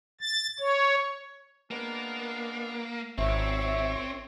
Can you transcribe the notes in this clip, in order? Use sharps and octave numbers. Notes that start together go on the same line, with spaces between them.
A6
C#5
G#3 A#3 B3 D4
G#1 A#2 C4 C#5 E5